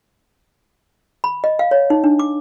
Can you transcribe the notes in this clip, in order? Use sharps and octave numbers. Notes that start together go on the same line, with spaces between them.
B5
D#5
F5
C#5
D#4
D4
D6